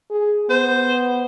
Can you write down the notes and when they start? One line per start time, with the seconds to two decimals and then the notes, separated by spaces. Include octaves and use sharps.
0.11 G#4
0.50 B3 C5